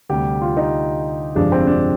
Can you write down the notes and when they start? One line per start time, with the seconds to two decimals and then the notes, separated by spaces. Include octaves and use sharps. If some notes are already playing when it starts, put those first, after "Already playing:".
0.09 D2 C3 G3 G4
0.42 F4
0.57 D#4
1.35 G1 F2 C3 F3 G#3 D4
1.52 C4
1.67 D4